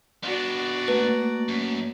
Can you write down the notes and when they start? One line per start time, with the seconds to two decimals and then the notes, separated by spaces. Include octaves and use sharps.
0.23 B3 D4 F#4 D5
0.88 A3 A#3 B4
1.49 F#2